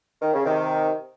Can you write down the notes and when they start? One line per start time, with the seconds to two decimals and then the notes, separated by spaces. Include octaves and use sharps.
0.22 D#3
0.33 C#3
0.45 C3 D#3